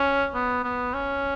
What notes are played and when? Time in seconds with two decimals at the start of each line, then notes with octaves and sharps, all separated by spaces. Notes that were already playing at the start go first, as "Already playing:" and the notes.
Already playing: C#4
0.34 B3
0.64 B3
0.94 C#4